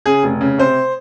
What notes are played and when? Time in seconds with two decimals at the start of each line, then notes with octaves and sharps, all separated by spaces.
0.06 C#3 G#4
0.23 F1
0.41 C#3
0.58 C3 C5